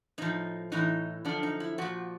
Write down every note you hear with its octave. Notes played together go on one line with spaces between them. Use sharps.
A2 F3 D#4
A2 E3 D#4
F#2 D3 F3 D4
D#4
E4
A#2 F3 F#4